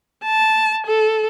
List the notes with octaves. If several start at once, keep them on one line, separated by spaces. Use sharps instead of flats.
A5
A4